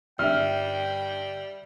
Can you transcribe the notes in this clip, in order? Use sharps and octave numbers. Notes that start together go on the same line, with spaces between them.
G1 G3 D4 E5 G5 F6